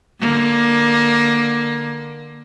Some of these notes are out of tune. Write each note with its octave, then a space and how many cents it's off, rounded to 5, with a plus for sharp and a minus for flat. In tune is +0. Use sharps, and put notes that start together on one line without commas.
D3 +20 A#3 +20